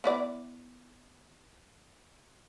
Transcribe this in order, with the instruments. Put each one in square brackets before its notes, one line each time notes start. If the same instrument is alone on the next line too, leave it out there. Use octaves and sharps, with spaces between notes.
[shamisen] B3 E4 D5